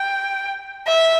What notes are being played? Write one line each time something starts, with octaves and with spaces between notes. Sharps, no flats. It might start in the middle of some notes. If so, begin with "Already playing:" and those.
Already playing: G5
E5